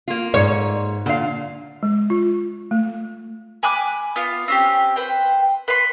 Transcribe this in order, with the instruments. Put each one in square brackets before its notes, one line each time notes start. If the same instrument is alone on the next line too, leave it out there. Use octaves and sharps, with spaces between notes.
[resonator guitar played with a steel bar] A#3 F4
[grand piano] G#2 [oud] C#5
[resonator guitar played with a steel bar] A#2 F5 [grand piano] D3
[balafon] G#3
F4
A3
[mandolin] G#5 B5 D6 F#6
B3 F4
C4 C#4 G4
B4 C5 G5
B4 C6